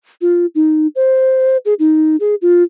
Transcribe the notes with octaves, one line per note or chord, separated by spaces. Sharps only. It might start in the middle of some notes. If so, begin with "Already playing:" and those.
F4
D#4
C5
G#4
D#4
G#4
F4